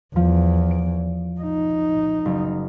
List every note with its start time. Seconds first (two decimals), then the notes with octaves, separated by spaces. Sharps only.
0.16 E2 F3
0.71 D7
1.41 D#4
2.25 F#1